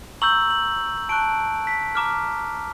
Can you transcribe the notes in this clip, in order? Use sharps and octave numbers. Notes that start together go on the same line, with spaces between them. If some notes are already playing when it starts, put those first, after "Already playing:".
A#5 C#6 E6 G6 F#7
F#7
A5 C#6 F#6 D7
B6
A#5 D6 F6